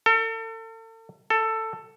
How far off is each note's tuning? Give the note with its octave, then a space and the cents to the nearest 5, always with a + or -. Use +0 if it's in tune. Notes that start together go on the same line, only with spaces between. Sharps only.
A4 +40
A4 +15